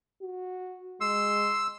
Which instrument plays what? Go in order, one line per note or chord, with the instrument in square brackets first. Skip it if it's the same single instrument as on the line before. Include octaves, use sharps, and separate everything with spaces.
[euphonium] F#4
[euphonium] G#3 [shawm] C6 [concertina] E6